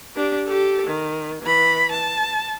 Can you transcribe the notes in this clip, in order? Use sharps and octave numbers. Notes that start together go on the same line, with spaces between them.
D4 G4
G4 A4
D#3
E3 B5
A5